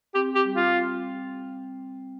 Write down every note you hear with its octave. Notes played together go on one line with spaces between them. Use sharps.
C4 G4
G4
G3
F4
C4